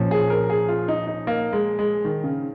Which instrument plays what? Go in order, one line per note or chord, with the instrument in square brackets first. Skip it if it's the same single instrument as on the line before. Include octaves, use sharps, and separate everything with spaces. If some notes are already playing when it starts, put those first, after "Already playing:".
Already playing: [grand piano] A#2 F3 C#4
[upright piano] G#4
A#4
G#4
F4
D#4
D#4
A#3
G#3
G#3
D#3
C#3